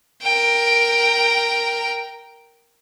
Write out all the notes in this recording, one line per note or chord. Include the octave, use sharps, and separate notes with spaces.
A#4 G5